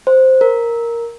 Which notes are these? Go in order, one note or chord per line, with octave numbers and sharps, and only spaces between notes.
C5
A#4